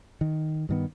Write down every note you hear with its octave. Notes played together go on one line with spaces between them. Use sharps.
D#3
G2 D#3 B3